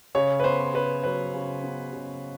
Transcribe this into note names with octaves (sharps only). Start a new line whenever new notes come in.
C#3 C#5
B4
B3 C5
C#3 B4
F#3 B4
C#3
B3
C#3